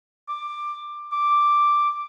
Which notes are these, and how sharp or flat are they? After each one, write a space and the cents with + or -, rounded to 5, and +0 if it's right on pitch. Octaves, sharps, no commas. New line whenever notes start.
D6 +15
D6 +0